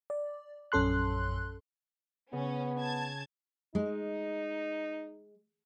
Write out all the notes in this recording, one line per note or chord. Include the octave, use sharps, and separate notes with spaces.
D5
A#1 F#2 C#4 A4 C6 F#6
C#3 B3 C#4
A5 G#6
G#3 D#4